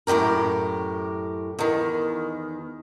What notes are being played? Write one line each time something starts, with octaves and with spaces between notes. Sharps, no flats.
F#2 A2 C3 G4 A#4
E2 D#3